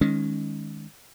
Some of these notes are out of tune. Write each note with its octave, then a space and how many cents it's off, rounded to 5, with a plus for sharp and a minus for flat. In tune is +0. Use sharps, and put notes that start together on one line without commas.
D#3 +0 G#3 +0 C#4 +0